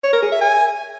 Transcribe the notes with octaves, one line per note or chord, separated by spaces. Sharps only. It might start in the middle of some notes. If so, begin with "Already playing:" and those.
C#5
A#4
G#4
E5
G#5